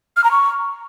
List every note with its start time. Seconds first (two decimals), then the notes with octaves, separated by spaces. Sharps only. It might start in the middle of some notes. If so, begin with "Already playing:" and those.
0.17 F6
0.24 A#5
0.31 C#6